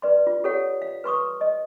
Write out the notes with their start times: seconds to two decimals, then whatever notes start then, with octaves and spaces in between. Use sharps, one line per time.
0.02 B4 D5 C6
0.27 F4
0.44 G4 A4 C#5 F5 F#5
0.82 F5
1.04 B4 C6 C#6 D#6
1.41 D#5